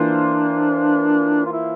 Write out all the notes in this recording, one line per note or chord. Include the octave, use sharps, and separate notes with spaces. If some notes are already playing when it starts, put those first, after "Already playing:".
Already playing: E3 A#3 D4 F4 C5
F4
E4